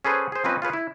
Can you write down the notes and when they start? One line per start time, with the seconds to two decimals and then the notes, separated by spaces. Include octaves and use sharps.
0.05 C#4 G#4 A4 B4 C5
0.32 G#4 C5
0.44 F3 C4 C#4 B4 D#5
0.62 F4 G#4 B4 C#5
0.73 E4